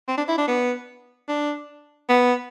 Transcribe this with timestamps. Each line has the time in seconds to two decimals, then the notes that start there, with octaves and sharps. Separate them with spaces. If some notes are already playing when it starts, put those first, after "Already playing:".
0.08 C4
0.17 D4
0.28 E4
0.38 D4
0.48 B3
1.28 D4
2.09 B3